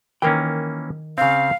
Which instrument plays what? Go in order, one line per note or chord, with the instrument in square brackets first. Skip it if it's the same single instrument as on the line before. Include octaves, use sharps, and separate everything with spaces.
[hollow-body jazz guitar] D#3 A#4 G5 [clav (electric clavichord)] E3 A#3 C#4
[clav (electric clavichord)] C#3 C4 [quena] F5